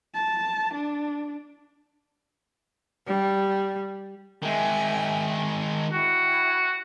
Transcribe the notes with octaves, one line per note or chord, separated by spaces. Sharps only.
A5
D4
G3
D#3 G#3 E5 G5 G#5
E4 F#4 G5